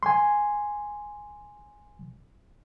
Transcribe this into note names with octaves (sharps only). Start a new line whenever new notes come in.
G#5 C6